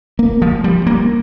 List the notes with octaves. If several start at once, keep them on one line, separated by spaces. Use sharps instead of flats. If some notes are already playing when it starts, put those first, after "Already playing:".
A#3
F3
G3
A#3